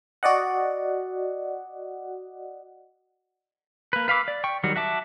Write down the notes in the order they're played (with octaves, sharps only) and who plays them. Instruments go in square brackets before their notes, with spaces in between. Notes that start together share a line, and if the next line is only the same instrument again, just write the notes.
[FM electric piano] F#4 D5 D#5 F#5
[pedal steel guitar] A#3 B4
B4 F5 B5 D6 E6
D5
G5 C#6
D#3 F#3 G3 F#4
F#4 E5 A5 D6